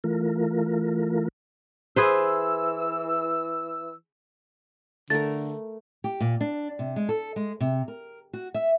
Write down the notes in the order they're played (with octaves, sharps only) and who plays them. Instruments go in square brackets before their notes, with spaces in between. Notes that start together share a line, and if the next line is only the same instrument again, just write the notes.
[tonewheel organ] E3 A3 F4 A#4
[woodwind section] E3 E6 [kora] G#4 B4 C5
[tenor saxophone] D3 [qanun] A3 A#4 [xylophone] A6
[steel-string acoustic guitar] G4
A#2
D4
C3
G#3
A4
G#3
C3
A#4
F#4
E5